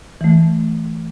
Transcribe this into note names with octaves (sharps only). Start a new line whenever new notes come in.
E3 A3